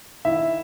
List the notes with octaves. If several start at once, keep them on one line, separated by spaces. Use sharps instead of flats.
D#3 E4 E5